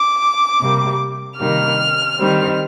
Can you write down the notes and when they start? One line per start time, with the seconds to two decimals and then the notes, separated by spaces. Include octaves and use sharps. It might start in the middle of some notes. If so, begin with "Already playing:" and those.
Already playing: D6
0.61 C3 G3 A#3
1.40 C3 D#3 G3 A#3 F6
2.19 D#3 G3 C4